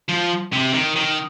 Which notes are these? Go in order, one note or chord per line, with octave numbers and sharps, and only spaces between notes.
F3
C3
D#3
D#3